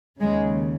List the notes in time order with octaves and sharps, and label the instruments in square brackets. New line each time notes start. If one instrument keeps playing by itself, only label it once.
[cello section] D#2 C#3 G#3